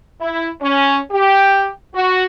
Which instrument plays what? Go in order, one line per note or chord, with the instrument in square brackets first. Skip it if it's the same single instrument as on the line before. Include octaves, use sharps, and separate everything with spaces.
[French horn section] E4
C#4
G4
F#4